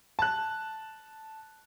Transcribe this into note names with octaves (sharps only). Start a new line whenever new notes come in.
A5 F#6